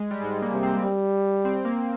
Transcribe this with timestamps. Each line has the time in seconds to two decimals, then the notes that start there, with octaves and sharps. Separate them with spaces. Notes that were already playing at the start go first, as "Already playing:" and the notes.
Already playing: G#3
0.11 G3
0.21 G#2 G#3
0.42 A#3
0.51 C3
0.63 C4
0.83 G3
1.45 C4
1.65 A#3